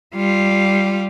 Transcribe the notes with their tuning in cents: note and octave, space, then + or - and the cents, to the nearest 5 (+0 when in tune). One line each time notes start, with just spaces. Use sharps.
G3 +0 F4 +0